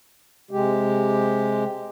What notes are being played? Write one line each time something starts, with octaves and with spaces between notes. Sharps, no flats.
C3 G#3 G4